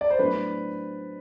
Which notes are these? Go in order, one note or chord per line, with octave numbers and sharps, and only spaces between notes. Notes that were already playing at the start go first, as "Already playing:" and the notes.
D5
C5
A2 F#3 B3 D4 B4